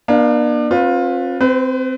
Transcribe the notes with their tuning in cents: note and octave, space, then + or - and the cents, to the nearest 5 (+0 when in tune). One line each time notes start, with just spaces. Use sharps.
A#3 +45 D4 +35 F5 +0
C4 +40 F4 +20 B4 +0
C4 -10 B4 +35